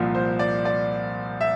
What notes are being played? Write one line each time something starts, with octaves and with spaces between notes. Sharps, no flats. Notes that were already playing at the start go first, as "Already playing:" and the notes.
Already playing: C2 A#2 F3
C5
D5
D5
E5